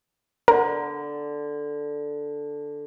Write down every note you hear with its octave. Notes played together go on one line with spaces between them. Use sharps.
D3 A#4